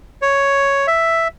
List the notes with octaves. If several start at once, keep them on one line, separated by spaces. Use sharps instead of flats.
C#5
E5